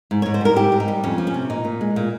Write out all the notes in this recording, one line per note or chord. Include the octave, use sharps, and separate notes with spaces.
G#2
G#2 C#5
C5
G3 A#4
G#2 G4
G#2
D#4
G3
F2 C#4
F3
C#4
C3
A#2 D#4
A#2
G#3
A#2